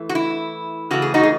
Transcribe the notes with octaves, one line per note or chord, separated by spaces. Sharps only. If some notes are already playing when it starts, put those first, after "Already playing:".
Already playing: E3 A3
F#4
E4
C#3 E3 A3 F#4
G#4
D#4 F#4
G#4